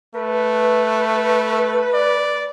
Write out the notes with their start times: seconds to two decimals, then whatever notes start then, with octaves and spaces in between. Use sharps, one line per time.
0.15 A3 B4
1.93 D5